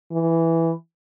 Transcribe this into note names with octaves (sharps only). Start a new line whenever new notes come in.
E3